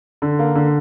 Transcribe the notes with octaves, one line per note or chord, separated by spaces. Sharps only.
D3
A#3
D3